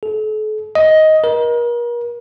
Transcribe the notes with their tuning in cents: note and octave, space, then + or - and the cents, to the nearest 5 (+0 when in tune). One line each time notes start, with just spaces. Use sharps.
A4 -40
D#5 +10
A#4 +40